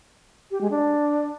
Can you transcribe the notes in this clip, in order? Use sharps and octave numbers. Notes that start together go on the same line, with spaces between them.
G4
G#3
D4